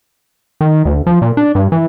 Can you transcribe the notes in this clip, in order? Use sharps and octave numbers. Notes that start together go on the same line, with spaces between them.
D#3
D2
F3
A#2
D4
G2
E3